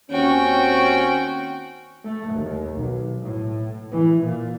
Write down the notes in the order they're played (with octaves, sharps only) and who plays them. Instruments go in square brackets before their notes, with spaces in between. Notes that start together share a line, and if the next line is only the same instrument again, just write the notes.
[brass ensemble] D#2 C4 C#4 [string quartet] F#4 G5
[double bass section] A3
D#2
B1
A2
E3
A#2